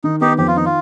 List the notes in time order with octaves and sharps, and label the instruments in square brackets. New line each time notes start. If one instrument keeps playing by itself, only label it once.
[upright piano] D#3 [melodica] D#4
[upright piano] B3 [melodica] D#4 G4
[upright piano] F2 [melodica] G4
[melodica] F4
[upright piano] D#3 [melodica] D#4
[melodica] F4